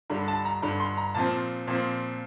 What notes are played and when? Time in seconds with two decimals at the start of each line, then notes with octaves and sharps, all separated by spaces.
0.10 G2 D3 G3 D4
0.28 A5
0.45 A#5
0.62 G2 D3 G3 D4
0.80 C6
0.97 A#5
1.15 A#2 F3 C4 A5
1.67 A#2 F3 C4